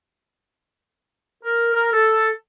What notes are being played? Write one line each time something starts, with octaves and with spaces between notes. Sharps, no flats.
A#4
A#4
A4